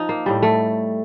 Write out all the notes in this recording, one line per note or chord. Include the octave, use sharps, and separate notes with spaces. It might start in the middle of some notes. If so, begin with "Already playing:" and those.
Already playing: F3 D#4
A#3
A2 G3
A3